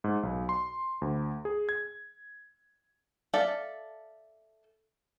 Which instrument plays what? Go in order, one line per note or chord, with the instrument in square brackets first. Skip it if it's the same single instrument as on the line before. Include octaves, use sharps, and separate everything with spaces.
[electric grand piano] G#2
B1
C6
D2
G#4
G#6
[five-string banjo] A4 D5 E5 F5 A5